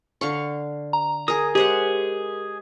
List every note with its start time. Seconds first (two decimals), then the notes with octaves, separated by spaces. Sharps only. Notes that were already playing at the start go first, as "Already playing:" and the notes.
0.21 D3 F5 C#6
0.93 A#5
1.28 G#4 A#4 D#6
1.55 G#3 G4 G#4 C5 F#5